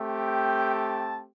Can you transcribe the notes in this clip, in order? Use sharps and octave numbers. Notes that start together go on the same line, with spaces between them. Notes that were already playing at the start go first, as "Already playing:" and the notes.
Already playing: A3 C4 G4
G5
A5